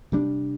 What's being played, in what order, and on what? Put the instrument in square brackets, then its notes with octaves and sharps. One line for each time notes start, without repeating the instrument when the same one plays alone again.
[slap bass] C3 G3 D4